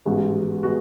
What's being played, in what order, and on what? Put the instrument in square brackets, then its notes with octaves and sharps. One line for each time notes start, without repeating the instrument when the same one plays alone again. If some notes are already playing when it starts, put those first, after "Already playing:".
[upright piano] A1 G#2 G#3 B3 F#4
G#3 B3 F#4